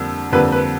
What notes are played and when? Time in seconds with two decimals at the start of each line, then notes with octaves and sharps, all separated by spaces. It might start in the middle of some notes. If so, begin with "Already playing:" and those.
Already playing: F2 D3 G3 A#3
0.32 F2 D3 G3 A#3 B4
0.52 B4